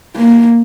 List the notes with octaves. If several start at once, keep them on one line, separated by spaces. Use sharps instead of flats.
A#3